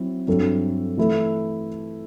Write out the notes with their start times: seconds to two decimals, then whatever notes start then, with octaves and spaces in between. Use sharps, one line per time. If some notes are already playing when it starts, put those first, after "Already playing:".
Already playing: F#3 C4 E4
0.27 G2 F#3 C4 E4 A4
0.97 E3 A3 E4 A4